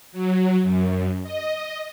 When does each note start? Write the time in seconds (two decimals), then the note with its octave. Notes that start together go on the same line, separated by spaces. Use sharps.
0.12 F#3
0.63 F#2
1.23 D#5